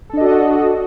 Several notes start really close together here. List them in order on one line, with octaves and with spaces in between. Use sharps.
A4 D4 D#5 F#4